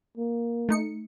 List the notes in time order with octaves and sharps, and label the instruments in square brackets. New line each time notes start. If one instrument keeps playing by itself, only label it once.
[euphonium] A#3
[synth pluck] A3 D#4 C#7